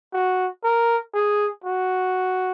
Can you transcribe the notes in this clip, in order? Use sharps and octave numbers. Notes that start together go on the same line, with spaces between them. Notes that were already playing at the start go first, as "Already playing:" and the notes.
F#4
A#4
G#4
F#4